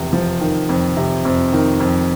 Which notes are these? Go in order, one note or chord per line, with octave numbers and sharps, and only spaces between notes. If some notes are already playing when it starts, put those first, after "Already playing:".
Already playing: F1 E2 C3
F3
D#3
F2
C3
F2
D#3
F2